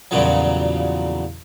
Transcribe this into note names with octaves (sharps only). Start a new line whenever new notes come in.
E2 G2 A#2 C#3 F3 F#3